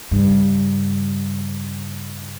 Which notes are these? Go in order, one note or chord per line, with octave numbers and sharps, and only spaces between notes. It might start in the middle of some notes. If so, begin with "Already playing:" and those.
G2 C#3